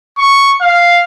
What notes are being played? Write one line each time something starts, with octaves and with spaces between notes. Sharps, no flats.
C#6
F5